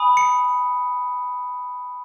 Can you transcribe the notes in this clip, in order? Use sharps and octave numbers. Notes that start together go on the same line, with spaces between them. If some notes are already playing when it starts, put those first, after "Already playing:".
Already playing: G#5 B5 D#6
C#7